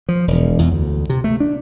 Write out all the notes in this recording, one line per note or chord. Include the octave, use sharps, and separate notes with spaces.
F3
E1
E2
D2
C3
A3
D4